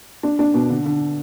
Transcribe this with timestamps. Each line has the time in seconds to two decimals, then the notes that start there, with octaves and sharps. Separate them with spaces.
0.23 D4
0.39 D4
0.54 B2
0.70 D3
0.86 D3